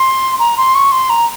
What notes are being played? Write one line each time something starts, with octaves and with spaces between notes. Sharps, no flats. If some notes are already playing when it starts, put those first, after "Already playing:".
Already playing: C6
A#5
C6
C#6
C6
A#5